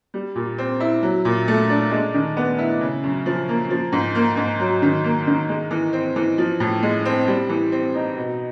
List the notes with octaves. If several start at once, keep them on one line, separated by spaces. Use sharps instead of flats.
G3
A#2
C4
E4
F#3
A#2
A3
D4
G#3
D#3
B3
E4
C#3
F#2
F3
A#3
F3
G#2
A#3
G#2
F#3
D#3
A#3
D#3
G#3
E3
C4
E3
F3
A2
G#3
C4
G3
E3
C4
D#4
B2